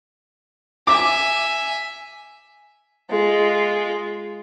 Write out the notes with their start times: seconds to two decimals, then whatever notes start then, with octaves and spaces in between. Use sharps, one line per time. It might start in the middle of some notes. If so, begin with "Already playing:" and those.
0.87 E5 G#5 D6
3.10 G#3 F4